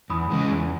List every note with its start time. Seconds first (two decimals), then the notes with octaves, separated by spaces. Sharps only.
0.10 E2 B5 D#6
0.30 C#3 G#3 C#4 G#4
0.50 E2